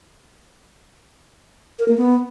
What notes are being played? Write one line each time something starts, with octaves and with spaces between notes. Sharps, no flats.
A#4
A#3
B3